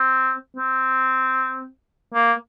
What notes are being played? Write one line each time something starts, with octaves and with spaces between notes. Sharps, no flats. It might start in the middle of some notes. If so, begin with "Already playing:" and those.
Already playing: C4
C4
A#3